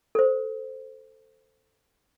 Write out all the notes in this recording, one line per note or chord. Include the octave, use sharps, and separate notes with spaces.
A4 C5